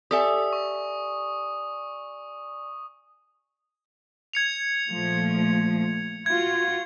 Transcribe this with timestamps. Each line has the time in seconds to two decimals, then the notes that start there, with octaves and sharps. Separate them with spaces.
0.11 G4 A4 D5 E5 G#5 D#6
0.53 C#6
4.33 G#6 C#7 F7
4.89 A#2 F3 A3
6.26 F4 F#4 G#6